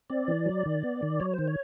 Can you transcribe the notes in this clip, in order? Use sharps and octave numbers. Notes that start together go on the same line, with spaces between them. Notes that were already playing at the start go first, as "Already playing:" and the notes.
C4 D5
E3
F#3
D#3
B3
D#3
F#3 C#5
D#3 C5
C#5